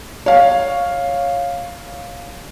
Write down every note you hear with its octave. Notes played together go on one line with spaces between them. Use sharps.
C#5 F5